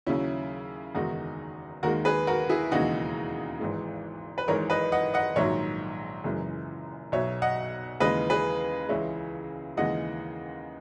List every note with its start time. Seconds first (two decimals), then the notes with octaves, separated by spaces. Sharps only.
0.06 D#2 C#3 F#3 C#4 E4
0.95 F#1 E2 D#3 G#3 D#4 F#4
1.83 D#2 D#3 G#3 F#4 A#4
2.05 G#4 B4
2.27 F#4 A#4
2.49 E4 G#4
2.71 E1 D#2 C#3 E3 G#3 D#4 F#4
3.60 G#1 G#2 E3 G#3
4.38 B4
4.48 G#1 G#2 E3 G#3 A#4 C#5
4.70 B4 D#5
4.92 D#5 F#5
5.14 D#5 F#5
5.36 A#1 G#2 D#3 F#3 C#5 E5
6.24 F#1 F#2 E3 G#3
7.12 B1 B2 F#3 C#5 E5
7.42 D#5 F#5
8.00 D#2 C#3 E3 G#3 B4 D#5
8.30 G#4 B4
8.88 C#2 C#3 E3 G#3 C#5 E5
9.77 D#2 C#3 E3 G#3 D#5 F#5